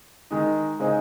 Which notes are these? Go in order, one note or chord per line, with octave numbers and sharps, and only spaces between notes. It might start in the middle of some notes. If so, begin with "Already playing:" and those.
D#3 G#3 D#4
C#3 G#3 C4 D#4 G#4